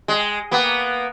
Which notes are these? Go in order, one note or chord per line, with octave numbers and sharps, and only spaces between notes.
G#3
A#3 B3